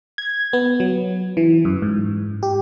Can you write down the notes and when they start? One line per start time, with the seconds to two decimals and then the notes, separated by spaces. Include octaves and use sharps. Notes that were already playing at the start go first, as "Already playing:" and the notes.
0.18 G#6
0.53 B3
0.80 F#3
1.37 E3
1.65 F#2
1.82 G#2
2.43 G4